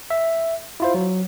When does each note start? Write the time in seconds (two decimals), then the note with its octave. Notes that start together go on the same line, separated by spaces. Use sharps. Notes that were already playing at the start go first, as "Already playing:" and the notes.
0.10 E5
0.80 E4 F4 C5
0.94 F#3